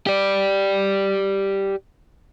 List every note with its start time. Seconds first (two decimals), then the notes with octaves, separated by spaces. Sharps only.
0.07 G4 D5